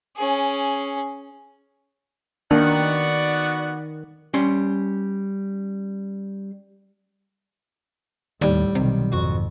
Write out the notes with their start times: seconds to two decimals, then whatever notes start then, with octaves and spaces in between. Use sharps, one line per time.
0.16 C#4 G#4
2.51 D#3 A#3 B3 D4 F#4 D5 F#5
4.34 G3 C#4 C6
8.42 D#2 A2 G3
8.75 B1 C3 D#3
9.12 G#1 F2 F#4 C#6